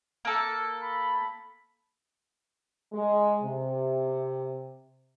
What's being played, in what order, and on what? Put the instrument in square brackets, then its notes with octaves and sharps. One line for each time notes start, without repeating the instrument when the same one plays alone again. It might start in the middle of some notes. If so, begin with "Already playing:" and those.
[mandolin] A#3 A4
[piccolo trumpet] B5
[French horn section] G#3
C3